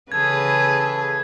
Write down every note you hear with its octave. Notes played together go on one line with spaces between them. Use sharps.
C#3 E3 G#4 A4 B4 G#6